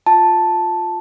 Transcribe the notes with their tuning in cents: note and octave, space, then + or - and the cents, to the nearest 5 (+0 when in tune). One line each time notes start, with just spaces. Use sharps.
F4 +15 A5 +0